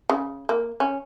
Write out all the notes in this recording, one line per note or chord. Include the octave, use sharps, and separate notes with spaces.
C#3
A#3
C#4